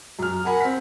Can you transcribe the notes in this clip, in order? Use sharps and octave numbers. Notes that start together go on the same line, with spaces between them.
F#2 F6
A#4 F#5 G#5 B5
C4 B6